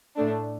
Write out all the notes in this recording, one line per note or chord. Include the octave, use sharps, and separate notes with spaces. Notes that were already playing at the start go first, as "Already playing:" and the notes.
A2 A3 D4